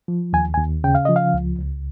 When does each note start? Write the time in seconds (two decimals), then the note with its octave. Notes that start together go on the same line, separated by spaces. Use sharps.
0.08 F3
0.33 D#2 G#5
0.54 G#5
0.58 D#2
0.84 C#3 G5
0.95 F5
1.05 F3 D#5
1.16 F5
1.34 C#2
1.59 C#2